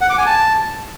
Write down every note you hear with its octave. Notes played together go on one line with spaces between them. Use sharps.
F#5
D6
G#5
A5